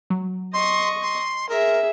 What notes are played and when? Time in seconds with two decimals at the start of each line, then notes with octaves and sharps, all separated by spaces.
0.10 F#3
0.54 D#5 C6 C#6
1.02 C6
1.49 G#4 A#4 E5